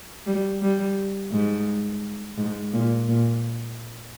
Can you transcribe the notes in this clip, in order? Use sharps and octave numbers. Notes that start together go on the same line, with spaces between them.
G3
G3
G#2
G#2
A#2
A#2